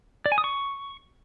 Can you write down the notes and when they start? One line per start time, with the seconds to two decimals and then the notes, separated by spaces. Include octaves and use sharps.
0.26 D5
0.32 G#5
0.38 D#6
0.44 C#6